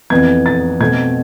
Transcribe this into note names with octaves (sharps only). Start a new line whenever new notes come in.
F2 E3 B3 G#6
A6
B2 A3 C4 G#6